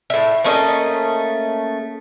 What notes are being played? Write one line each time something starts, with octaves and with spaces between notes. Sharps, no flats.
A2 E5
A3 A#3 C#4 D#5